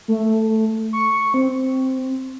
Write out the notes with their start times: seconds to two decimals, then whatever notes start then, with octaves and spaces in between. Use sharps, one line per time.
0.08 A3
0.93 C#6
1.34 C4